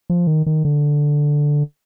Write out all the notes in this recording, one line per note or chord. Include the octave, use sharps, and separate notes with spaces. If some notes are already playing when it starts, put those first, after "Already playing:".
F3
D#3
D#3
D3